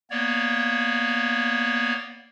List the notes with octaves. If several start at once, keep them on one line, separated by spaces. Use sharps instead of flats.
A#3 B3 C#5 D5